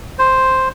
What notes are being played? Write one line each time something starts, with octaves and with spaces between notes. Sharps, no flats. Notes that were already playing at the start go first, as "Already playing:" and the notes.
C5